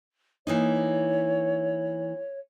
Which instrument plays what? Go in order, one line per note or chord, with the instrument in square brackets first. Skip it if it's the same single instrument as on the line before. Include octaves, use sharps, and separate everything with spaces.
[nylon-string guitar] E3 A#3 D#4 [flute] C#5